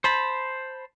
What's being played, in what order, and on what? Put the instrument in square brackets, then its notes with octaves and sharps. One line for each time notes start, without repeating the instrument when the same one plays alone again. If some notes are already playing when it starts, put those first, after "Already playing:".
[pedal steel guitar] C5 A5 B5